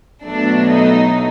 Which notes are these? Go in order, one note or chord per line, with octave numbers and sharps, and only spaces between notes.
B2 F#3 A3 D4
D#4